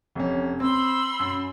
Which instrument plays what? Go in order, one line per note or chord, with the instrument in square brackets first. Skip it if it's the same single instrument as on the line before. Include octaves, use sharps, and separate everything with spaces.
[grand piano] F1 C#4
[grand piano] C4 [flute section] B5 C6 E6
[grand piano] F#2